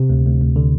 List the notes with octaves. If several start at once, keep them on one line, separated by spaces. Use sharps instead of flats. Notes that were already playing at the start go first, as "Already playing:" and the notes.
Already playing: C3
D2
D2
D2
D3